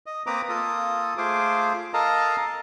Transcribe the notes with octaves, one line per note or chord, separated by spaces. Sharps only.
D#5
A#3 C4 B4 A#5 D6 D#6
A#3 F4 A4 D#6
A3 F4 G#4 C5 D6
A4 A#4 D#5 F5 A5 A#5